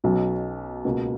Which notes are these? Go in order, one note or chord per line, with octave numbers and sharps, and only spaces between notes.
B1 B2 F#3 C#4
C#2 B2 A#3